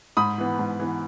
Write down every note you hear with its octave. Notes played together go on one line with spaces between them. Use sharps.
G#2 B5 D#6
E3 B3
G#2
E3 B3